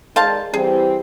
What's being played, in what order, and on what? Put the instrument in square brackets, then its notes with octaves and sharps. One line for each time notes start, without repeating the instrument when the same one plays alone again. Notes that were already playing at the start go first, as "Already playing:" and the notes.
[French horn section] D#3 G#3 D5 [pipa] C5 F5 A5
[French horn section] E3 G3 C4 [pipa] G#4